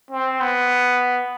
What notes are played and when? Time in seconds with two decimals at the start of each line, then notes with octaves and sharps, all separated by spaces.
0.11 C4
0.41 B3